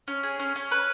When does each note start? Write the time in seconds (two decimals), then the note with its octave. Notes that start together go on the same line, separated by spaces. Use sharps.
0.08 C#4
0.23 G#4
0.39 C#4
0.56 C#4
0.71 B4